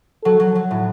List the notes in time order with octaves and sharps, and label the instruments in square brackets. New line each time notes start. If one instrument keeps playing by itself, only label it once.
[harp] F#3 [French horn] A4
[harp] F#3
F#3
A2